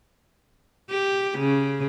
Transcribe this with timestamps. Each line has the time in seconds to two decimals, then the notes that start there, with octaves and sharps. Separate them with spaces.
0.90 G4
1.39 C#3